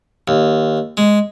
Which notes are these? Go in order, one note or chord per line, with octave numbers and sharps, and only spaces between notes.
D#2
G#3